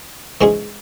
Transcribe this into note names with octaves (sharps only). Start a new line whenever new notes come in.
G#2 E3 G#3 C#4 G#4